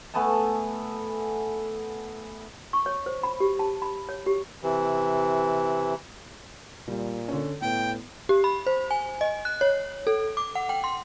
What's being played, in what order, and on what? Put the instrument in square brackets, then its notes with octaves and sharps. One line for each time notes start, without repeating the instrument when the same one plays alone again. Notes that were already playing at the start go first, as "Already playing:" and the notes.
[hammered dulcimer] A3 B3 G#5 A5
[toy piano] C#6
C#5
C5
B5
G4
A5
B5
C#5
G4
[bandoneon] C3 E3
[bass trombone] A#2 [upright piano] G3
[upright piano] D3 C#4
[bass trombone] A2 [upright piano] B3 [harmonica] G5
[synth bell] G4
B5
C5
G#5
D#5
F#6
C#5
A4
D6
F#5
G5
C6